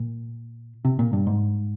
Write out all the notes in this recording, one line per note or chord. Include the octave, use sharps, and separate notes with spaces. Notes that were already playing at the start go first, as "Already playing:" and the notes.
Already playing: A#2
C3
A#2
G2
G#2